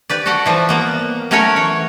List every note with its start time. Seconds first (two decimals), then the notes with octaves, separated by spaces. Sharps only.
0.10 G4 B4 D5
0.26 F#4 A4 D5 F#5
0.46 E3 F3 G3
0.69 A#3 B3
1.31 F#3 A3 C#4 A#4 C#5 G#5
1.56 E3 C#5